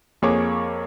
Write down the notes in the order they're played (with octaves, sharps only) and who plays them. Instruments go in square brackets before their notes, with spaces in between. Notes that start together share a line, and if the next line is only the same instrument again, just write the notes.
[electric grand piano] F2 A#3 G#4 C#5 C#6 D6